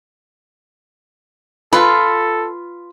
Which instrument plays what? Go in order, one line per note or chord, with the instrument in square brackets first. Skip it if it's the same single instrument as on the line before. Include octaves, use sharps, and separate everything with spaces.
[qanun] F4 [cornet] A4 [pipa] B4